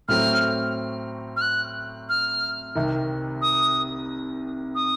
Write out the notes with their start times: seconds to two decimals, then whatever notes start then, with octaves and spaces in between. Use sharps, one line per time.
0.08 A2 F#3 A3 C4 F6
1.36 F6
1.41 F#6
2.09 F6
2.75 C2 C3 D#3
3.42 D#6
4.75 D#6